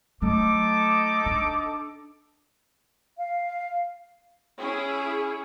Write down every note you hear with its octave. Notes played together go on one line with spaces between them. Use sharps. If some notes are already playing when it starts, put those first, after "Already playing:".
F#3 A3 D#4 A4 D6
D4
F5
C#4 E4 G#4